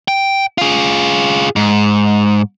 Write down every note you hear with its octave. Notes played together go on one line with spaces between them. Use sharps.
G5
F4 G#4
G#2